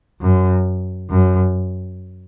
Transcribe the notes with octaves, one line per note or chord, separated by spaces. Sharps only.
F#2
F#2